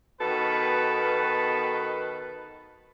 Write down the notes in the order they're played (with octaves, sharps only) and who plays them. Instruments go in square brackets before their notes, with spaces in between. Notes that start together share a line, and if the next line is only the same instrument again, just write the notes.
[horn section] B2 D#3 B3 A4 B4